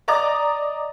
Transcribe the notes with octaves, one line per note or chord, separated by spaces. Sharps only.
D5 D#5 A#5 D6 A6